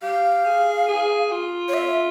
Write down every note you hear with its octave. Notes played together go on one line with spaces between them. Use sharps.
G4 F5
G#4
G#4
F4
C#5
E5